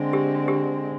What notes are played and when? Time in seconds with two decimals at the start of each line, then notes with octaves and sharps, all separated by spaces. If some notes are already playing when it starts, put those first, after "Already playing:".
Already playing: D3 G#3 C4
0.13 G4
0.48 G4